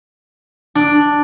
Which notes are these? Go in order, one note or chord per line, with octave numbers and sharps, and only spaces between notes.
D4